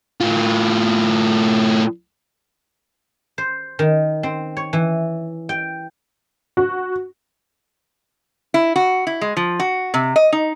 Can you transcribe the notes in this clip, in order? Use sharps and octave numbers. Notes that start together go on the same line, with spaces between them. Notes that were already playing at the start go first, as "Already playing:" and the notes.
A2 F4
C5
D#3
C4
C#5
E3
G5
F#4
E4
F#4
E4
G#3
F3
F#4
C3
D#5
D#4